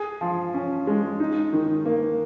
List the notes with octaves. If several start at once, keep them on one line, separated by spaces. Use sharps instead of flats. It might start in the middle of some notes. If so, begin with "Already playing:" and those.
Already playing: G#4
F3
C#4
G#3
D#4
D#3
A#3